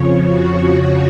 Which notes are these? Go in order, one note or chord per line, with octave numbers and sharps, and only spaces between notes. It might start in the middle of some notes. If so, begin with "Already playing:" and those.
Already playing: F2 C#3 F3 C#5
F#4